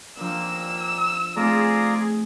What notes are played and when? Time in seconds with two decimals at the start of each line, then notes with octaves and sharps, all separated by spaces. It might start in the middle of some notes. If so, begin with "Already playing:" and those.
0.17 D#2 A#2 F3 A#3 D4 E6
1.36 A3 C4 D#4 F4 G#4 D5 A#5